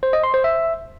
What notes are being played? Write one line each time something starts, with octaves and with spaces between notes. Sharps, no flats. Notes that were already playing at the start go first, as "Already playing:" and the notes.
C5
D#5
C6
C5
E5